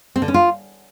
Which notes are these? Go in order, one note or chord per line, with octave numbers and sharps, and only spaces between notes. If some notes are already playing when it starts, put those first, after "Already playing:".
C4
D3
C#4
F4